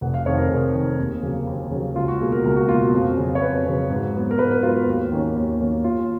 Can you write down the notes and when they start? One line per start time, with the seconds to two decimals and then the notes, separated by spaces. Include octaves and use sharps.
0.01 F1 F#5
0.14 F5
0.26 F2 D#3 C#5
0.38 A#4
0.50 F1 G#4
0.74 F2 D#3
0.99 D#2
1.23 C#3 F#3 A#3
1.47 D#2
1.71 C#3 F#3 A#3
1.96 C#2 F4
2.08 F#4
2.20 B2 A#3 G#4
2.32 A#4
2.44 C#2 A#4
2.57 F#4
2.69 B2 A#3 F4
2.81 F#4
2.93 F2
3.17 C#3 F#3 C#4
3.35 C#5
3.41 F2 B4
3.66 C#3 F#3 C#4
3.90 G#2
4.15 F#3 B3
4.31 A#4
4.39 G#2 B4
4.51 B4
4.63 F#3 B3 F4
4.75 F#4
4.87 D#2
5.12 D#3 A#3 C#4
5.36 D#2
5.60 D#3 A#3 C#4
5.84 D#2 F4